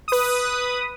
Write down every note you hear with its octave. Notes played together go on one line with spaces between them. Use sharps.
B4 D#6